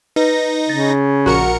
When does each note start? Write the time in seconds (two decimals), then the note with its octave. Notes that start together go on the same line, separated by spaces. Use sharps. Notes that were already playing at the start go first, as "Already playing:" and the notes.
0.16 D#4 B4 A#6
0.69 C#3 A6
1.26 A#1 F#4 A#4 C#7